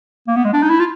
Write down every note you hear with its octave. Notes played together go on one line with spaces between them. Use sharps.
A#3
B3
G#3
D4
D#4
E4
F4